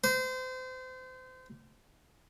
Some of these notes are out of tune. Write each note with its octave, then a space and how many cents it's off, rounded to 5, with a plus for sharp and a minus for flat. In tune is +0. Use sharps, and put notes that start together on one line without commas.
C5 -30